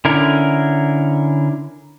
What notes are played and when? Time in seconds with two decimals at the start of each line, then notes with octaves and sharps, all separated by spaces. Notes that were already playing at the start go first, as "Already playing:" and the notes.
0.05 D3 C#4 E4 A#4